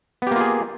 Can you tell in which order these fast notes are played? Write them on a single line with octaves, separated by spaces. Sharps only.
B3 G4 A#3 F4 G#4